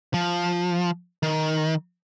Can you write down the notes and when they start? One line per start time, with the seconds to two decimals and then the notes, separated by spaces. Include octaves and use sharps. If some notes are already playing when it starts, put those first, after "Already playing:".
0.14 F3
1.23 D#3